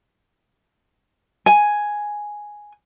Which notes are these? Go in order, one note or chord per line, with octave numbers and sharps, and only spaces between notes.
G#5